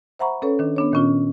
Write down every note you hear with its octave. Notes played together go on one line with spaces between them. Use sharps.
C5 E5 F#5 A#5 B5 C#6
C#4 A4 B4 C#5
D#3 D4
B3 D4 C#5
A#2 D#3 C#4 F4